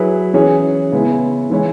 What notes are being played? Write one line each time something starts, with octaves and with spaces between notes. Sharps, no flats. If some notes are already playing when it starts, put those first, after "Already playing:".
Already playing: F#3 E4 G#4 B4
E3 C#4 G#4 C#5
C#3 G#3 B3 E4
E3 G#3 E4 C#5